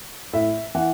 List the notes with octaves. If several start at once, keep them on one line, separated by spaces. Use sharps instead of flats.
A2 E5
E3 F#5